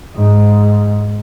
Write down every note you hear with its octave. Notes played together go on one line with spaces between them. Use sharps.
G#2